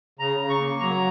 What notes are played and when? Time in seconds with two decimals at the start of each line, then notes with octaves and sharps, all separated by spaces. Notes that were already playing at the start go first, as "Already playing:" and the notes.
0.19 C#3 A#5
0.40 C#3
0.50 C#6
0.60 A#3
0.80 F#3 A#5